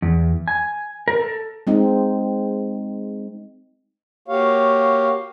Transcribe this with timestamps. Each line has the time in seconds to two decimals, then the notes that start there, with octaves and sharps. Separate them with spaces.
0.02 E2
0.48 G#5
1.08 A#4
1.19 A4
1.67 G#3 C4 D#4
4.28 A#3 F#4 G4 C#5 F5